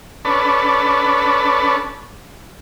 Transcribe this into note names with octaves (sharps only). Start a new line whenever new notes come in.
C#4 D4 A4 B4